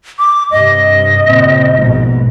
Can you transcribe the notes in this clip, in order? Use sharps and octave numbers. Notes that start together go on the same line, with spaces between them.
D6
G2 C3 D#5
A#2 C#3 C4
A#1 G#2 B2